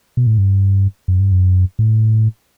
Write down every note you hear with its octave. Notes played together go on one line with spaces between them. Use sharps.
B2
A2
G2
F#2
G2
F#2
A2